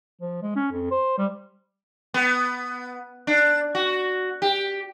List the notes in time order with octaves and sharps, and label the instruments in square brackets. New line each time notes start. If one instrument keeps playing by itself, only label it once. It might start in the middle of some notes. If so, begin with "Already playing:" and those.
[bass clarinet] F3
G#3
C#4
F2
C5
G3
[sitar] B3
D4
F#4
G4